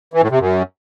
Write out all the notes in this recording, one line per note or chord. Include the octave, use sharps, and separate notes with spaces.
E3
A2
C3
F#2